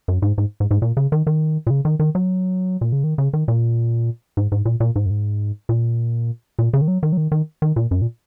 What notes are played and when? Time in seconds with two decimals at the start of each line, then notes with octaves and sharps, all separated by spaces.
0.08 F#2
0.22 G#2
0.38 G#2
0.60 G#2
0.71 G#2
0.82 A#2
0.97 C#3
1.12 D#3
1.27 D#3
1.67 A#2
1.70 C#3
1.85 D#3
1.99 D#3
2.15 F#3
2.81 A#2
2.92 C#3
3.04 D#3
3.18 C#3
3.33 D#3
3.48 A#2
4.37 G#2
4.52 G#2
4.65 A#2
4.80 A#2
4.96 G#2
5.06 F#2
5.10 G#2
5.69 A#2
6.59 A#2
6.73 C#3
6.81 D#3
6.88 F#3
7.03 D#3
7.13 F#3
7.17 D#3
7.32 D#3
7.62 D#3
7.76 A#2
7.91 F#2
8.02 A#2